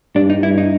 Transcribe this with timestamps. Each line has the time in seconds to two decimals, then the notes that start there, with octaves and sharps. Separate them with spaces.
0.15 G2 D4
0.30 D#4
0.43 G2 E4
0.58 D#4